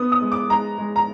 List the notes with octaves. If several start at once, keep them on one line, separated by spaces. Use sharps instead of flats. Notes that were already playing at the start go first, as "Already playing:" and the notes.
Already playing: B3 D#6
D#6
G#3
D6
G#3 A#5
G#3
A#5